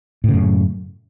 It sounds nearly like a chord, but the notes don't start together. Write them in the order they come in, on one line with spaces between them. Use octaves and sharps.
A2 C#3 F#2